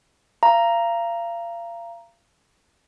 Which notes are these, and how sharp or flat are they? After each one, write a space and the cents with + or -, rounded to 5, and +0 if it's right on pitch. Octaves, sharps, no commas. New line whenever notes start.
F5 -35 A#5 +0